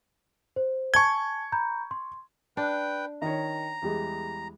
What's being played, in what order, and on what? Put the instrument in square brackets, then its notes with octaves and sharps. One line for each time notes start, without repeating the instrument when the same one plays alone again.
[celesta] C5
[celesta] G#5 A5 G7 [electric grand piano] C#6 G#6
[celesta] A#5 B5 G6
C6
[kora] D4 [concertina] B4 G5
[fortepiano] D#3 C#5 [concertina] A#5
[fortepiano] E2 G3 G#3